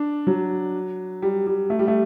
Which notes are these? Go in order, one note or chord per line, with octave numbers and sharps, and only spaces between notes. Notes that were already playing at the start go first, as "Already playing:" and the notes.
Already playing: D4
F#3
G3
G3
A3
G3
A3